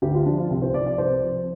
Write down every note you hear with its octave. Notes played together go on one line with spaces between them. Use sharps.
D2 G4
F4
D3 F3 D4
F4
C2
C5
C3 F3 D5
D5
C2 C5
C3 F3